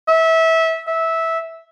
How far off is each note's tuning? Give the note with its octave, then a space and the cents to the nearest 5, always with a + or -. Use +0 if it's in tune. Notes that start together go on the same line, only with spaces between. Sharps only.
E5 -20
E5 -15